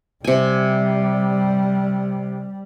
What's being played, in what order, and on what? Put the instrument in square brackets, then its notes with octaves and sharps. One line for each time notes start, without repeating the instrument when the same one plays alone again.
[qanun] C3 G#5 [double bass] G3